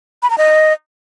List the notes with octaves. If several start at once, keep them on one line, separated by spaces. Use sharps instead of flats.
B5
A#5
D#5